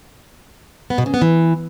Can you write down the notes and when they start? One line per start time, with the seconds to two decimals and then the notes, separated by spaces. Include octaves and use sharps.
0.90 B3
0.98 B2
1.06 C#3
1.14 B3
1.22 E3